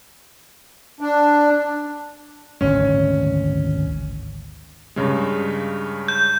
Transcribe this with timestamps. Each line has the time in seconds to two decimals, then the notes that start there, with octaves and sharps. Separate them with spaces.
1.01 D4
2.61 G#1 D2 C#4
4.96 G2 C#3 G#3
6.08 G6